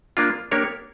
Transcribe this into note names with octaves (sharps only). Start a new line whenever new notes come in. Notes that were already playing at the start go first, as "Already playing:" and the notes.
A#3 D4 F4
A#3 D4 G4 A#4 C#5